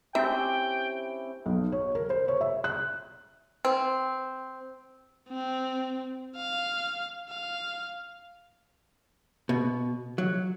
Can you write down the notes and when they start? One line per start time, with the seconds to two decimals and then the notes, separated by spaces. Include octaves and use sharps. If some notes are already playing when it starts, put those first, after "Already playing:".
0.15 C4 C#4 E4 G4 E5 G5
1.46 B1
1.72 C#5
1.95 A#4
2.10 C5
2.28 C#5
2.41 E5
2.64 F#6
3.65 C4
5.29 C4
6.37 F5
7.29 F5
9.49 B2
10.18 F#3